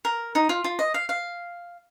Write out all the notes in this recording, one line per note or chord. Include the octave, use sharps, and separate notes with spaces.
A#4
D#4
F4
F4
D#5
F5
F5